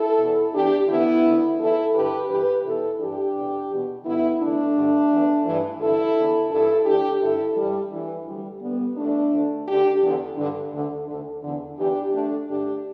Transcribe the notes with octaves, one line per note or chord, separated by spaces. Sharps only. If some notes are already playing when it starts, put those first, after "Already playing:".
Already playing: E4 A4
E2 B2
E2 E3 D4 G4
D2 D3 B3 E4
D2 D3
E2 E3 E4 A4
G2 D3 G4 B4
G2 E3 G4 B4
E2 B2 E4 A4
G2 E3 D4 G4
E2 B2
E2 B2
G2 D3 B3 E4
E2 D3 A3 D4
G2 D3
E2 E3
G2 E3
G2 D3 E4 A4
E2 D3
G2 E3 E4 A4
D2 D3 D4 G4
G2 D3 E4 A4
G2 E3 G3
D2 D3 E3
D2 D3 G3
D2 D3 G3 B3
E2 E3 A3 D4
D2 D3
D2 D3 D4 G4
E2 D3
G2 D3
D2 D3
D2 D3
E2 D3
E2 E3 D4 G4
D2 D3 A3 D4
G2 D3 D4 G4